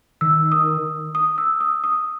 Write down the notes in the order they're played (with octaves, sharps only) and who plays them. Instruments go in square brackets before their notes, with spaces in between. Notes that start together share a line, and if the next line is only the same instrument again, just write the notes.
[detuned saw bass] D#3 [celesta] E6
[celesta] D#6
D#6
E6
D#6
D#6